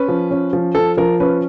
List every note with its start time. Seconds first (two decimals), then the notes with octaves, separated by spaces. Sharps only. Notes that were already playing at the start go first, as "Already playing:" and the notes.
Already playing: C#4 B4
0.08 F3
0.31 C#4
0.53 F3
0.75 F3 A4
0.97 F3 A#4
1.20 C#4 B4